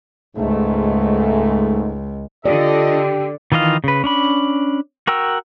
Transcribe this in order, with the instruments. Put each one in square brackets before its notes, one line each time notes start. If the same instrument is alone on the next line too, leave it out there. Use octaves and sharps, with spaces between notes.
[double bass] C#2 [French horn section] G#2 A3
[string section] D3 [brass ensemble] F4 A4 D#5 [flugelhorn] G4 [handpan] D5
[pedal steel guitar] D#3 E3 F4 D#5 F5
C#3 B4
C#4 D4 B5
F#4 A#4 G5 E6